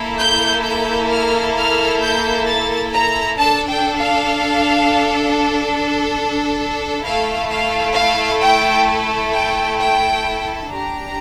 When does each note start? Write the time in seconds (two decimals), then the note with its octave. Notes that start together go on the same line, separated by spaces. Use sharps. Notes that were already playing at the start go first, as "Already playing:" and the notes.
Already playing: A#3 E4 A4
0.18 G6
0.63 G6
1.09 F6
1.55 F6
2.01 G6
2.46 A6
2.93 A#5
3.38 D4 A4 A5
3.69 G5
3.99 F5
7.04 A3 E4 A4 F5
7.50 F5
7.96 F5
8.41 G5
9.33 G5
9.79 G5
10.70 D4 G4 A#5